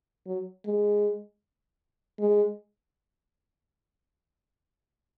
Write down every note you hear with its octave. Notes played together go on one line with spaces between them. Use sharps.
F#3
G#3
G#3